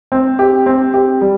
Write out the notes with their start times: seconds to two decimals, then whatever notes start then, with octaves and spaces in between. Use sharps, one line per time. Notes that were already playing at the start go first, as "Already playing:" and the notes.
0.12 C4
0.39 G4
0.66 C4
0.94 G4
1.21 G3